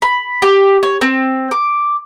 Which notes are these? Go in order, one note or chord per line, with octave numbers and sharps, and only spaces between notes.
B5
G4
C#5
C4
D6